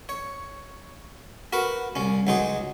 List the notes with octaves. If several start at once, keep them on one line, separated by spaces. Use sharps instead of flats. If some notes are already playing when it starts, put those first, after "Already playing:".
C#5
F#4 A#4 B4 F#5
C2 C#4
C#2 F#3 D#4 G#4 C6